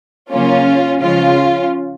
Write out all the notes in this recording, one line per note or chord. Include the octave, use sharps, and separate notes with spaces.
C#3 F#3 A#3 C#4 F4
C#3 F3 G#3 C#4 F4